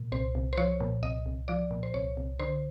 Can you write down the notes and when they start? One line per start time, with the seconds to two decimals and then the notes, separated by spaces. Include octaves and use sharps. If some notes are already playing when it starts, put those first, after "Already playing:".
Already playing: A#2
0.12 C2 C5
0.35 C2
0.53 C5
0.57 F3 C#5
0.80 A#2
1.03 C2 D#5
1.26 C2
1.48 F3 D5
1.71 A#2
1.83 C5
1.94 C2 C#5
2.17 C2
2.39 D3 C5